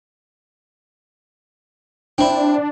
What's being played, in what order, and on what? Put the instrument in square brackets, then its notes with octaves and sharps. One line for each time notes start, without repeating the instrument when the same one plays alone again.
[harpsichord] C4 E4 [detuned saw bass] D4